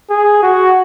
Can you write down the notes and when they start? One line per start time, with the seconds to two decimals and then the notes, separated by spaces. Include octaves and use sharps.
0.10 G#4
0.43 F#4